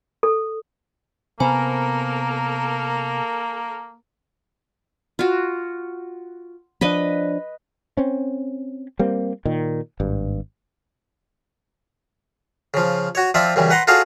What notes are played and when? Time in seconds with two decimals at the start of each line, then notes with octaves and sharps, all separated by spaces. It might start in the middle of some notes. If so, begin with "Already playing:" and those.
0.23 A4
1.40 C3 A#3 B3 A4 A#4 C5 G#5 B5
5.19 F4 F#4
6.81 F3 D4 B4 D#5 B5
7.97 C4 C#4
8.99 G3 A#3 C4
9.45 A#2 D#3
10.00 G#1 G2
12.74 C#3 F3
13.15 F#4 C#5
13.34 F3 C4 F4 D5 E5
13.56 F#2 C#3 E3 G3
13.70 B4 F#5 A#5 C6
13.87 F4 F#4 G#4 A4 C#5 F5